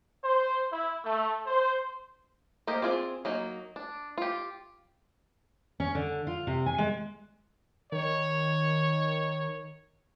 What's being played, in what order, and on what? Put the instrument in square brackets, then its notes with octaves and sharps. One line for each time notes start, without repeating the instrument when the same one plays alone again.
[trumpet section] C5
E4
A3
C5
[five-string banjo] A#3 G4 A#4 C5 D#5
C4 D4 F4 G#4 D5
F#3 A#3 D#4
D4
F4 G4
[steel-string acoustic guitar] C#4
D3
F4
C3
G#5
G#3
[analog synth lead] D#3 [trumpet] C#5